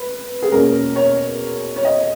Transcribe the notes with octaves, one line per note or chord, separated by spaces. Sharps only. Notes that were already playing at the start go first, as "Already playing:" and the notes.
Already playing: B4
G#4
E2 B2 A#3 C#4 A#4
C#5
C#5
D#5